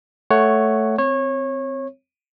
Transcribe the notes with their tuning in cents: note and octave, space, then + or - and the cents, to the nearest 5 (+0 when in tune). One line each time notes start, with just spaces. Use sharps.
A3 +0 C#5 +0 F#5 +10
C4 -10 C#5 -25